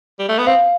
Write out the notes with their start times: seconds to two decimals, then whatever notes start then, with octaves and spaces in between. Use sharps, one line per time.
0.19 G3
0.29 A3
0.38 B3
0.47 C4 F5